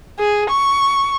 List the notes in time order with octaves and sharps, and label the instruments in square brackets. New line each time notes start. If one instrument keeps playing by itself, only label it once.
[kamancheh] G#4
C#6